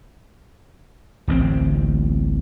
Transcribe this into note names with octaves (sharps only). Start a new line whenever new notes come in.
D1 A1 C4